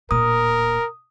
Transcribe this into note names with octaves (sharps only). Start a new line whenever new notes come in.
D1 A#2 A#4 D#6